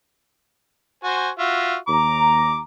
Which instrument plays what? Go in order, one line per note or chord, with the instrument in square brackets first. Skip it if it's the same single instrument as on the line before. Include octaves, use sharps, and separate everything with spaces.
[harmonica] F#4 C5 G#5
F4 F#4 E5
[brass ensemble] D#2 A#5 [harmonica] D6